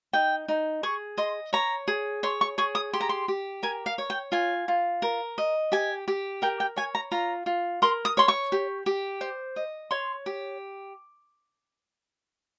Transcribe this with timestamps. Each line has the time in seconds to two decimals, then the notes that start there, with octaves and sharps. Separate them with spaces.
0.13 D#4 G5
0.48 D#4
0.83 G#4 C#6
1.18 D#5 C6
1.53 C#5 A#5
1.88 G#4
2.23 C#5 C6
2.41 C#6
2.58 G#4 C#6
2.75 D#6
2.93 G4 C6
3.01 A#5
3.09 C6
3.28 G4
3.63 A#4 G#5
3.86 F5
3.98 C#5
4.10 G5
4.32 F4 G#5
4.68 F4
5.02 A#4
5.38 D#5
5.72 G4 G#5
6.08 G4
6.42 A#4 G5
6.60 G5
6.76 C#5 G#5
6.95 A#5
7.12 F4 A#5
7.46 F4
7.82 A#4 C6
8.05 D#6
8.17 C#5 C6
8.28 C#6
8.52 G4
8.86 G4
9.21 C5
9.56 D#5
9.91 C#5 C6
10.26 G4